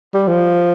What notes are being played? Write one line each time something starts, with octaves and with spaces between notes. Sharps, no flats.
G3
F3